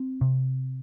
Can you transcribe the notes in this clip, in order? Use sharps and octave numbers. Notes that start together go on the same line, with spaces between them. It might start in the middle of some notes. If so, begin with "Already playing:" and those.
Already playing: C4
C3